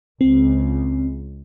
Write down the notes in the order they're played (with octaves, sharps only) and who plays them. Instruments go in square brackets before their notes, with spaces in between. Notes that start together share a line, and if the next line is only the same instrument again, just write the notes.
[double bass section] C#2 [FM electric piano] C4